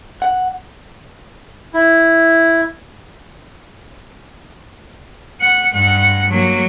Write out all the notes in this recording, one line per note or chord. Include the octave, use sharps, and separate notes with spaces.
F#5
E4
F#5
G2 F#5
F#3 A#3